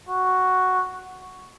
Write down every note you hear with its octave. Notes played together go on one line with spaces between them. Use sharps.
F#4